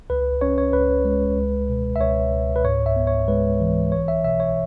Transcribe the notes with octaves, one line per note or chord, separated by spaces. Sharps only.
C#2 B4
C#4 C#5
C#5
C#2 B4
G#3
C#2
B2
E5
C#2 C#5
C#2
B4
G#2 C#5
E5
B3
C#5
G#3 B4
E3
B1 C#5
E5
B2 E5
C#5